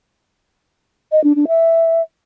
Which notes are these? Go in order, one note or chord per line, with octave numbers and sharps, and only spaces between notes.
D#5
D4
D4
E5